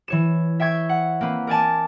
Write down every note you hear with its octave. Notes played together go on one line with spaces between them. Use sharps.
E3 C#5 E7
E5 G5 C#6 G#6
F#5
A#3 C4 B4
A#4 D5 G#5 A5